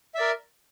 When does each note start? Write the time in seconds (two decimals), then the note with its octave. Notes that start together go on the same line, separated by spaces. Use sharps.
0.15 E5
0.18 D5
0.21 A#4